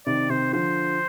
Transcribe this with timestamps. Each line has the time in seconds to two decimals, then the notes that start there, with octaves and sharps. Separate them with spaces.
0.06 C3 D#3 D5
0.30 C3 D#3 C5
0.53 D3 F3 C5